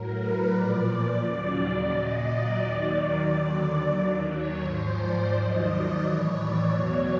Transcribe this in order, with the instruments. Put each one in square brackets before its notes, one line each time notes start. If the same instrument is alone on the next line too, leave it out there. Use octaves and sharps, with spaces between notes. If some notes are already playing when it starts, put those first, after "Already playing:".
Already playing: [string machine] A2 F#3 A#4
B4
A#2 F3 D5
D#2 C#3 F#3
A#2 F#3 D#5
D5
D#2 D#3 F#3
D#2 D3 F#3 D5
D#2 D#3 F#3
C#5
G#2 F3 C5
D5
D#2 D#3 F#3 D#5
D5
A2 E3 C#5
D5
E2 B2 F#3 C#5